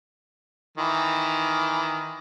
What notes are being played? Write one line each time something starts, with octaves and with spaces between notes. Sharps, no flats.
D#3 E3